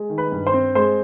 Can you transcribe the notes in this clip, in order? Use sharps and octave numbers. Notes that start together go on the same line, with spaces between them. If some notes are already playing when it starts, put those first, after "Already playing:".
Already playing: G#3
D#3
B4 B5
G2
C5 C6
C4
G#3 C5 C6